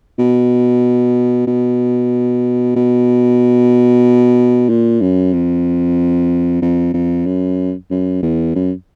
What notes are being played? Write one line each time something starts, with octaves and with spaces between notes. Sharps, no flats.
B2
B2
B2
A#2
F#2
F2
F2
F2
F#2
F#2
E2
F#2